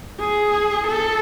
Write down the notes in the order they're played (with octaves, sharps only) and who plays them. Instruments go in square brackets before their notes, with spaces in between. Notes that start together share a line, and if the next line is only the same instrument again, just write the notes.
[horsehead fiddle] G#4
A4